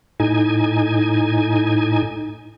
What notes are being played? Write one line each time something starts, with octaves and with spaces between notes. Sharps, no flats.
A2 D#4 G#5